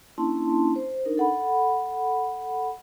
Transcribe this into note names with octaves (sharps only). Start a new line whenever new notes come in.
A#3 C#4 D4 E4 A5 C6
C5
D4 D#4 A#4
A4 F#5 B5